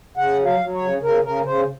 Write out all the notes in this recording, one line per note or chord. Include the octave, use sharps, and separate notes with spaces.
C#3 F#5
F#3
F5
F#3
C#5
C#3
C#3 A#4
C#3 A#4
C#3 C5